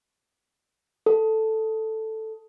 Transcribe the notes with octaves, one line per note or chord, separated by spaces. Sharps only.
A4